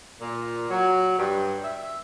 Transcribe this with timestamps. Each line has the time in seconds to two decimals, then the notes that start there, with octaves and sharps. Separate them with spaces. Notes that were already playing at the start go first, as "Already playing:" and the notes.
0.21 A#2
0.70 F#3
1.19 G2
1.64 E5